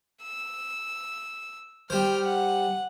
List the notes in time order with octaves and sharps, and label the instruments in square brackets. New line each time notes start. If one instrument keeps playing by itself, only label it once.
[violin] E6
[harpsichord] G3 C5 [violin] G5 F6
[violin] F#5